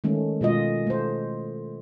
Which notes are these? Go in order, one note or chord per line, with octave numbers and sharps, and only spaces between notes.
D#3 G#3 A3 C#4
B2 G#3 F4 D#5
A3 C5